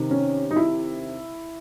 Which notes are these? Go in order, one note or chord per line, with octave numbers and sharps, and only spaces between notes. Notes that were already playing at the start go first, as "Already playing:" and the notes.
Already playing: C3 D#3
C#4
D#4
E4